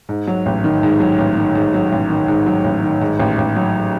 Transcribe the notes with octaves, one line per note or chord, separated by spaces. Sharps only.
G#2
F#3
A1
D#3
G#2
F#3
A1
D#3
G#2
F#3
A1
D#3
G#2
F#3
A1
D#3
G#2
A1
A1
F#3